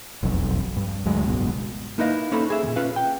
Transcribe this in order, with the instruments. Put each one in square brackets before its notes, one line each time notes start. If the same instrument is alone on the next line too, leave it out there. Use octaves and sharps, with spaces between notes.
[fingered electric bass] E1 B1 F2
G2
D2 F#3 G#3
F#1 C#2 G#2 B2
[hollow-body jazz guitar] A#3 D#4 E4 B4 D#5 F5
A#3 C#4 D#4 A4 C5 B5
G#4 E5
D#2 A#2
C#4 F4 B4 F5
G5